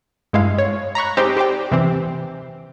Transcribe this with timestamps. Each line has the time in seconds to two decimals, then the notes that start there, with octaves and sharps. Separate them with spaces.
0.33 G2 G#3 E4 F5
0.58 C#5
0.95 A#5 B5 C#6 F#6
1.17 G#3 C4 D#4 G4 C5 D#5
1.37 G4 C5 D5 G5
1.72 C3 E3 C4